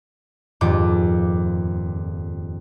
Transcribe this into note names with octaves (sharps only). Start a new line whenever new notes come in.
D#1 F2 G#2 F4 D6